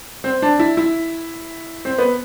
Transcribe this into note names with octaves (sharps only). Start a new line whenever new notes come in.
C4
D4
E4
E4
C4
B3